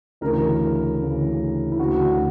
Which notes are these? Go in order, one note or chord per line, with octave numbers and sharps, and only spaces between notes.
D2 C#3 E3 A#4
D2 C#3 E3
E4
D2 C#3 E3 F#4